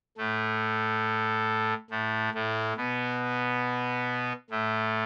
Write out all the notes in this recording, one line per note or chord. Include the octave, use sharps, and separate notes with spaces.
A2 A3
A2 A3
A2 A3
B2 B3
A2 A3